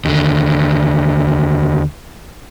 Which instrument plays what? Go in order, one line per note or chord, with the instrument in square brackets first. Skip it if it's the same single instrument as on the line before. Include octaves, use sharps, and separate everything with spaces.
[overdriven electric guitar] D#2 D3